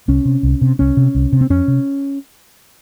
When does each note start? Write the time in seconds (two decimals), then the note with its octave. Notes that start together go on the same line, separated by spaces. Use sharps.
0.08 C2 C#4
0.25 C3
0.43 C2
0.61 C3
0.79 C2 C#4
0.97 C3
1.15 C2
1.32 C3
1.41 C4
1.50 F2 C#4
1.68 C3